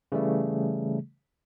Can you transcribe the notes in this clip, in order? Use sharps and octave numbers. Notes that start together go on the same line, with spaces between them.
C#3 E3 G3 A3